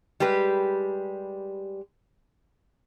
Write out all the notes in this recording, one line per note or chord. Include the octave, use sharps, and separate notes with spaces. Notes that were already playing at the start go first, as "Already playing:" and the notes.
G3 G#3 G4 B4